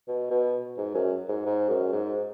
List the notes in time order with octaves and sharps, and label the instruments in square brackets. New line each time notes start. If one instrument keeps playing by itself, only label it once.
[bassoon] B2
B2
G#2
F#2
G#2
G#2
F#2
G#2